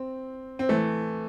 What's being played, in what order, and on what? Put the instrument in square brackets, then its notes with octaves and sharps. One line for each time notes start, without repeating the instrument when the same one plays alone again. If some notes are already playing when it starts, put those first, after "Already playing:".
Already playing: [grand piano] C4
C4
E3 A3